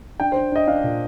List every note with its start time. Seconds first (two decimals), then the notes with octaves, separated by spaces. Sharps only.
0.20 D4 G5
0.32 D4 C5
0.52 D4 D#5
0.67 D4 F5
0.84 A#2